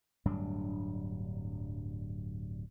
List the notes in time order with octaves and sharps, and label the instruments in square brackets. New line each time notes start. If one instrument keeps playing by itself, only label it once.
[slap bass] D1 G2 F#3 D4